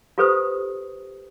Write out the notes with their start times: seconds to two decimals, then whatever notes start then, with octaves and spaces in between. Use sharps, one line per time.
0.18 F4 G4 A4 B4 C5 D#6